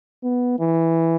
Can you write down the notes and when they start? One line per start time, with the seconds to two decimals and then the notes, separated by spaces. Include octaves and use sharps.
0.24 B3
0.59 E3